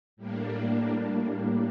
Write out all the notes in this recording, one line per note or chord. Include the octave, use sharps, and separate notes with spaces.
A2 G3 A#3 D4